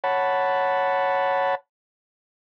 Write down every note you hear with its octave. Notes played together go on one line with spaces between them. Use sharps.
C#5 F#5 A5 B5